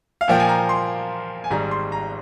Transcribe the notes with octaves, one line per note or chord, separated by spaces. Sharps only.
F5
A#2 F3 A#3 G5
G#5
A#5
C6
G#5
G#1 G#2 G3 A#5
C6
A#5